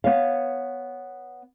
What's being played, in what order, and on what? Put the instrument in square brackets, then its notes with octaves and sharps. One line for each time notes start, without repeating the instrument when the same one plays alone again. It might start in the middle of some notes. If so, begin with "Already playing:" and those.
[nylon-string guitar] B3 C#5 F5